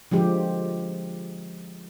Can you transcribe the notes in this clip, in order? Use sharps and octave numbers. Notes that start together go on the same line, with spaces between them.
D3 F3 G#3 G4